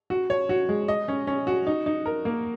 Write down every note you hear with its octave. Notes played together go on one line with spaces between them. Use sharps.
F#4
C#5
F#4
G#3
D#5
C#4
C#4
F#4
D#4
D#4
A#4
A#3